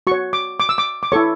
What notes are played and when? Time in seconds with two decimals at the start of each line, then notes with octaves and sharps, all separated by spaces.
0.07 F#4 C#6
0.12 C#5
0.33 D6
0.60 D6
0.69 E6
0.78 D6
1.03 D6
1.12 E4 A4 C#5 C#6